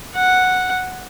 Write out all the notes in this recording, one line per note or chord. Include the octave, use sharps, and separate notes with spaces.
F#5